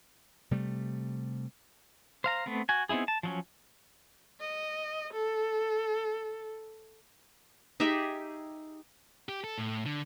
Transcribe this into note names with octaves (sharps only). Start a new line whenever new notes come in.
C3 G3 A3
C5 F5 A#5
A3 B3 C4
F#4 G#5
B3 C4 D#4 E4 G#4
A5
F3 F#3 C#4
D#5
A4
D#4 G4 G#4 E5
G4
A4
A2
D3